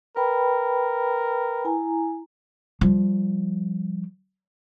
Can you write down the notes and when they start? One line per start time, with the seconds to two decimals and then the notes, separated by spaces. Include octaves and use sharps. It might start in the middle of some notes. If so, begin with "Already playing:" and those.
0.17 A#4 B4 G5 B5
1.65 E4 G#5 A#5
2.81 F3 G3